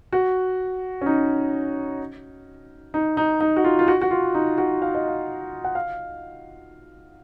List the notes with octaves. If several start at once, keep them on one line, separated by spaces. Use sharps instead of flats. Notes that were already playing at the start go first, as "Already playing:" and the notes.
F#4
C#4
D#4
D#4
D#4
D#4
F#4
F4
F4
F#4
F#4
F4
D#4
F#4
F5
D#5
F5
F#5
F5